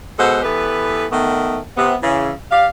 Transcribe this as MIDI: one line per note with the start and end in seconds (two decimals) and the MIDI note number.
0.18 0.42 47
0.18 0.42 56
0.18 0.42 69
0.18 0.42 72
0.18 0.42 78
0.42 1.04 52
0.42 1.04 59
0.42 1.04 67
0.42 1.04 69
0.42 1.04 71
1.11 1.57 51
1.11 1.57 57
1.11 1.57 59
1.77 1.95 48
1.77 1.95 59
2.02 2.31 49
2.02 2.31 52
2.51 2.66 67
2.51 2.66 74
2.51 2.66 77